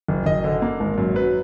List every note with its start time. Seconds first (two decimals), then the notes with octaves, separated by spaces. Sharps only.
0.08 F#1
0.26 F#1 D#5
0.44 D3
0.62 A#3
0.80 G#1
0.98 F#2
1.16 F#3 B4